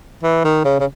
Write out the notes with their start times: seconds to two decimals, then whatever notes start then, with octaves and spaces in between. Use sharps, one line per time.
0.23 E3
0.44 D#3
0.65 C#3
0.80 C#3